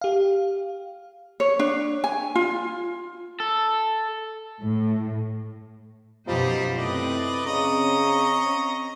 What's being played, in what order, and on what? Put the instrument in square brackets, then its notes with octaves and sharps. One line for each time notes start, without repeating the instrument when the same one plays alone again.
[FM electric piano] G4 F5
[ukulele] C#5
D4
G#5
F4
[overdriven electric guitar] A4
[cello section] A2
[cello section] F#2 B2 C5 [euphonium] F3 [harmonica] G3 D#4 G4
[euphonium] A2 [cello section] C3 C4 [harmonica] B4 D5 D#5
[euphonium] C#3 [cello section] C4 C#4 [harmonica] D#5 A#5 C#6